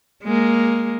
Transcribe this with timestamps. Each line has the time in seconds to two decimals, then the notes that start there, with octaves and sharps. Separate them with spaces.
0.24 G#3 A#3